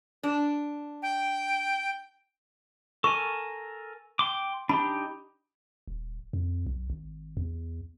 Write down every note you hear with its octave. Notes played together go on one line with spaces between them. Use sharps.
D4
G5
A4 A#4 G#5 C#6
G5 C6 D6
D4 D#4 G4 B5
D#1
F2
B1
G#1
E2